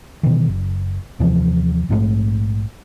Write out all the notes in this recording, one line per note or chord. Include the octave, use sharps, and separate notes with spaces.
B2 D#3 E3
F#1
D#2 C3 E3 F3
A#1 G#2 F3 A3